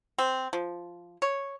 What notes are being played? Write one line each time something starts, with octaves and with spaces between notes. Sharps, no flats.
C4
F3
C#5